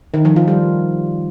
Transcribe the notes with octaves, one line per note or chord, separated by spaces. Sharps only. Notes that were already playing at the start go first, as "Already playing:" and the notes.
D#3
F3
F4
G3